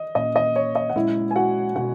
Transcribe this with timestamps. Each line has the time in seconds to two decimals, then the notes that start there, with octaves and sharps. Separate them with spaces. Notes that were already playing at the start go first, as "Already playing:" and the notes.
Already playing: D#5
0.15 A#2 A#3 C#4 D#5
0.36 D#5
0.56 C#5
0.75 D#5
0.90 F#5
0.96 A#2 G#3 C#4 E4 E5
1.31 G#5
1.35 F#4 F#5
1.76 B2 G#3 C#4 F#4 F#5